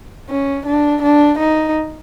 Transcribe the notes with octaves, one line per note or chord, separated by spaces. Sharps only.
C#4
D4
D4
D#4